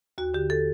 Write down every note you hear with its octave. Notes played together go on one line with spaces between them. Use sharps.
D#2 F#4
D3 G4
A4